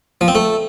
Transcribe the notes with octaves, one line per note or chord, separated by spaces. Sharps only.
F3
C4
A3